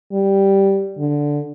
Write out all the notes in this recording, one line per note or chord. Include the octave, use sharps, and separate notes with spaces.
G3
D3